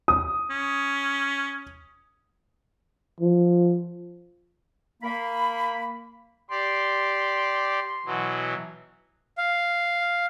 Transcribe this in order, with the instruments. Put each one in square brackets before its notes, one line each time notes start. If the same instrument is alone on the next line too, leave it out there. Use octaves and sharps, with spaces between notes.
[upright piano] D#6
[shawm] C#4
[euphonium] F3
[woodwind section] A#3 B5
[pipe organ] G4 D5 [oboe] C6
[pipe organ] B2 E3 F#3
[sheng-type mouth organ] F5